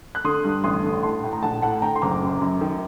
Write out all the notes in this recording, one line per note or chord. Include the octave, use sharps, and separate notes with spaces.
F#6
D3 C6 D#6
G2
A1 C6 D#6
D3
A2 A5 C6
A2
A#5
A#1 F#5 A5
A2 F#5 A5
D3 G5 A#5
C6
F#1 A#5 D6
F#2
F#2
D#3